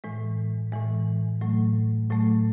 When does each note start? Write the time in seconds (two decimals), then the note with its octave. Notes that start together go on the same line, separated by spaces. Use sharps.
0.04 A2 E3 G#3
0.72 A2 E3 G#3
1.41 A2 F#3 A3
2.10 A2 F#3 A3